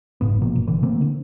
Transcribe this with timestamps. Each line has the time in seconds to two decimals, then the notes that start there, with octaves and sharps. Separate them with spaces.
0.21 F#1 G#2 B3
0.42 B2 F3 A#3
0.56 G1
0.67 B2 D3 E3
0.83 F3 A3 A#3 C4
1.01 D3